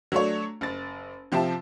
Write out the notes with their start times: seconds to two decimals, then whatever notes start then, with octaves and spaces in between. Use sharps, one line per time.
0.12 F#3 A3 D4 C#5
0.61 F#1 A6
1.32 C3 F3 G4 E5 A5